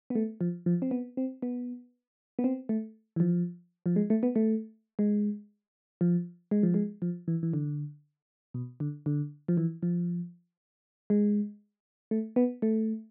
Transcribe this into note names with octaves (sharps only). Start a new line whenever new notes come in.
B3
A3
F3
F3
C4
B3
C4
B3
B3
C4
A3
E3
F3
F3
G#3
A3
B3
A3
G#3
F3
G#3
F3
G#3
F3
E3
E3
D3
B2
D3
D3
F3
E3
F3
G#3
A3
B3
A3